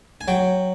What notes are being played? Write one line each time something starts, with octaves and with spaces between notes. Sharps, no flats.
G#5
F#3 G5